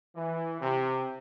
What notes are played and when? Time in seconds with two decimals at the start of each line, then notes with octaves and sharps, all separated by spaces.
0.15 E3
0.61 C3